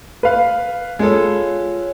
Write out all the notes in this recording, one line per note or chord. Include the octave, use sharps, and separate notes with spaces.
B4 F5
G#3 F4 A4 C#5